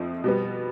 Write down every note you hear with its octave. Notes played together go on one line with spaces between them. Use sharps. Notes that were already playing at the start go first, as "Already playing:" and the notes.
Already playing: F2 F3 A3
B2 G3 B3